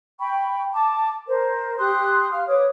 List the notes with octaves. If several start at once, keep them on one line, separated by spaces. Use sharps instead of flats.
G5 B5 C#6
A5 D6
A#4 C5
G4 C6 D#6 F#6
F5 F6
B4 C#5 D6 D#6